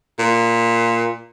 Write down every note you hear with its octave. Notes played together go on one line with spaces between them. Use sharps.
A#2